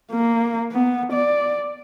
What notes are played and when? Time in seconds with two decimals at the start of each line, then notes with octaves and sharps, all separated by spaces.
0.12 A#3
0.71 B3
1.13 D5